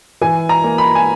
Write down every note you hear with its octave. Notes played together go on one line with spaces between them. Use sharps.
E3 G#5
A#5
A#3
B5
G#5